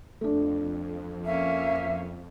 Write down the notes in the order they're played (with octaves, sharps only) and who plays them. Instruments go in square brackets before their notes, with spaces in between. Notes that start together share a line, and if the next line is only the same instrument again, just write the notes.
[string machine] F2 [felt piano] A3 D4
[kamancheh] A#3 C#4 [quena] E5